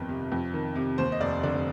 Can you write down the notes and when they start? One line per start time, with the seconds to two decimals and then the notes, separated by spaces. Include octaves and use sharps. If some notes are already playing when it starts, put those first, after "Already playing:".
Already playing: G1 F2 D#3
0.09 C3
0.32 F2
0.54 D#3
0.76 C3
0.98 D#2 C5
1.12 D#5
1.20 F1 D5
1.43 D3 D5